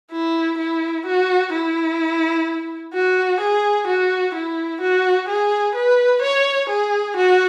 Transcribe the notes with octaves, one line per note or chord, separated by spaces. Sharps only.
E4
E4
F#4
E4
F#4
G#4
F#4
E4
F#4
G#4
B4
C#5
G#4
F#4